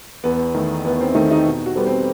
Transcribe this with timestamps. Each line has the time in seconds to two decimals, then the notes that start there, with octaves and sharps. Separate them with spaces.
0.24 E2 B3
0.55 D#3 A3
0.84 E2 B3
1.01 C4
1.15 D#3 A3 D#4
1.31 D#4
1.46 B2
1.66 F#4
1.76 G3 B3 D#4 A4 C5
1.87 C4